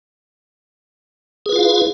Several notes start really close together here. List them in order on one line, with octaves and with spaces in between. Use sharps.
G#4 B4 F4 F5 E4